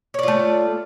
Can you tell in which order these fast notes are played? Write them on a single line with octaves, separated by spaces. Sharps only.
C#5 D5 F4 A3